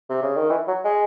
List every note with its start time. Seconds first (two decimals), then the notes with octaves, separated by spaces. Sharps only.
0.10 C3
0.23 C#3
0.36 D#3
0.50 E3
0.68 F#3
0.84 G#3